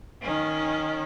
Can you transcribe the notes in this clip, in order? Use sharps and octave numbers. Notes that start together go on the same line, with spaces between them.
D#3 C#4